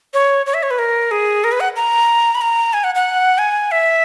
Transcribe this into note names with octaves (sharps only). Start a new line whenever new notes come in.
C#5
C#5
E5
C#5
B4
A#4
G#4
A#4
B4
F#5
A#5
B5
A#5
G#5
F#5
F#5
G#5
E5